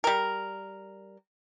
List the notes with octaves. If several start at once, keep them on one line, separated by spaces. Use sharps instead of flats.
G3 A#4